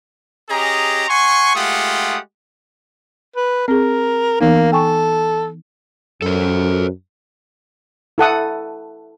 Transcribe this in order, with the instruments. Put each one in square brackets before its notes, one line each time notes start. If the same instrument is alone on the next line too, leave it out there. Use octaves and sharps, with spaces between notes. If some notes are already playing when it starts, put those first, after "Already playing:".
[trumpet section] C#4 G4 G#4 D#5 A#5
F#5 G#5 C6 C#6
G#3 A3 F4 G4 F#5 D#6
[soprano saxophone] B4
[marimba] C4 G#4 [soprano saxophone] A#4
[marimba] E3 B3 D#4 [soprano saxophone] A#3
[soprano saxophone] A4 [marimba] G5 G#5 C#6
[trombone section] F#2 [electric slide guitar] A4 C5
[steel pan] E4 A4 F#5 D#6